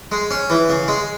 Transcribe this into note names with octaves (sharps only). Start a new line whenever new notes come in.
G#3
C#4
E3
C#3
G#3